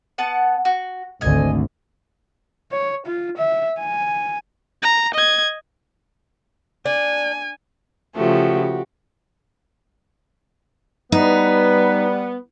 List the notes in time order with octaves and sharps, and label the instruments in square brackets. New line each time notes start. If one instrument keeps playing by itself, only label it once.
[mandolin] B3 F#5 A5
F#4
[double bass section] G#1 D2 [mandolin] D#5 G#5
[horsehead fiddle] C#5
F4
E5
G#5
[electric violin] A#5
D#5 G#6
[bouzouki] D4 [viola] G#5
[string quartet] C#3 F3 A3 [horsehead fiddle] F#4 G4
[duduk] G3 [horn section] B3 [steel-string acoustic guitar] D#4 [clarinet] B4